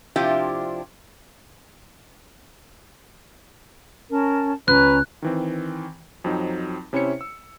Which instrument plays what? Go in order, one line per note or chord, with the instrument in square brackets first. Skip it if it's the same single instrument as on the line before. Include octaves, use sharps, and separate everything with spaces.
[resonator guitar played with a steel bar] C3 F3 D4 E4 F4 G4
[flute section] C#4 A#4 A5
[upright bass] C#2 [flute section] C#4 A#5 [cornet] B4 [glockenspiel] F#6
[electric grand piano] D#3 E3 C4
F2 F#3 C4 D#4
C3 C#4 E4 C5 C#5 C#7
E6